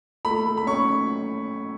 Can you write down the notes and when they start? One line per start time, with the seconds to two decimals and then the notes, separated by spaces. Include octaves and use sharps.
0.25 A3 B5
0.46 A3
0.57 B5
0.67 C#4 C#6